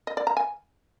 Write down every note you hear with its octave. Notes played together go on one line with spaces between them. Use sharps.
D#5
D5
A#5
G#5